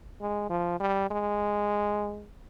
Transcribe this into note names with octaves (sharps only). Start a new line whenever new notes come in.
G#3
F3
G3
G#3